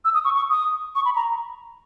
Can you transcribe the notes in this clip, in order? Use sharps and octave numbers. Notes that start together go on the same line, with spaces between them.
E6
D#6
C#6
C#6
D#6
C#6
B5
A#5